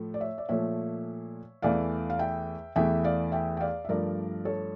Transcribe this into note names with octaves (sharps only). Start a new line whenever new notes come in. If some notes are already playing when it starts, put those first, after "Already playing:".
Already playing: A2 F3 A3
D5
C#5 E5
D5
A#2 F3 A3 C#5 E5
E2 E3 A3 D5 F5
F5
E5 G5
E2 E3 A3 E5 G5
D5 F5
E5 G5
G5
D5 F5
E5
G2 F3 A3 A#4 D5
A4 C#5